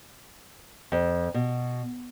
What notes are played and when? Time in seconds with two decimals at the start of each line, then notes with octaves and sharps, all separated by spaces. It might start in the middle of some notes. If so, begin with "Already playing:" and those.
0.92 F2
1.34 B2